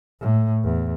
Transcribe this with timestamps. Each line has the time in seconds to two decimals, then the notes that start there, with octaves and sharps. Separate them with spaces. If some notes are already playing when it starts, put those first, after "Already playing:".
0.20 A2
0.64 E2